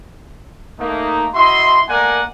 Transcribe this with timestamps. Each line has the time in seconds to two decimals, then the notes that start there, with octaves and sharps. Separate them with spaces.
0.80 A3 A#3 D#4
1.35 E4 F#4 D#5 E5 C6
1.89 A3 A#3 A#4 D5 F#5 G#5